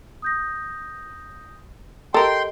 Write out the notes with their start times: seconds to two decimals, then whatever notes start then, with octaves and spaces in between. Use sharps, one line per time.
0.22 D#6 G6 A#6
2.14 G4 A4 A#4 D#5 G5 A#5 C6